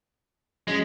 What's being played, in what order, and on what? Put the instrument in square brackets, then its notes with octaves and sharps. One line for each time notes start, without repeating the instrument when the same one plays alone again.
[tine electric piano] F#3 C#4 B6 [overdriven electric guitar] G#3